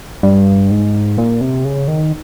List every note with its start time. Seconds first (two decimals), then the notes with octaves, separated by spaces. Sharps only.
0.23 G2
0.71 G#2
1.18 A#2
1.41 C3
1.65 C#3
1.88 D#3